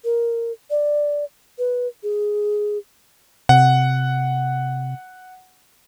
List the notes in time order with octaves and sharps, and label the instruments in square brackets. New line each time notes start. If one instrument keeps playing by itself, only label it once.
[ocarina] A#4
D5
B4
G#4
[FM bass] C3 [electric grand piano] F#5